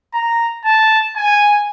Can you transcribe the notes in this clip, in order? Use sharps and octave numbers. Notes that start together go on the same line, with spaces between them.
A#5
A5
G#5